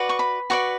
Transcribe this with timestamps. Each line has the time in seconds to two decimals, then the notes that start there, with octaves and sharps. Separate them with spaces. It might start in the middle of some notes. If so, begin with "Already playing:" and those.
Already playing: F#4 B4 D5
0.09 C#6
0.19 B5
0.50 F#4 B4 D5 C#6